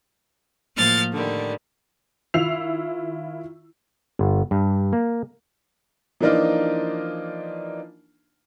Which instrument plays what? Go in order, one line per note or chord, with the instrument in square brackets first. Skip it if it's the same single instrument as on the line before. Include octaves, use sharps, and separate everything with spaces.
[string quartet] A2 F3 A#3 F6 G6 A6
A2 D3 D#3 G3
[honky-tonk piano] D#3 E4 F4 E6 C7 F7
[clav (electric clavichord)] G1
G2
A#3
[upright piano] E3 F3 A#3 D4 D#4 F4